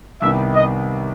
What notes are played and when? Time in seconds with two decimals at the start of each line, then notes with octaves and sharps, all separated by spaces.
0.21 C2 C3 D#3 G3 B3 E5
0.54 D#5